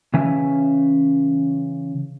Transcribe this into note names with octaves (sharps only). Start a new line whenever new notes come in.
C#3 E3 C#4 E5 G#5